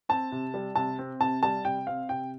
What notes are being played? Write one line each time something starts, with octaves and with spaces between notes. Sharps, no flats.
C4 A5
C3
G3
C3 A5
C4
C3 A5
G3 A5
C3 G5
C4 F5
C3 G5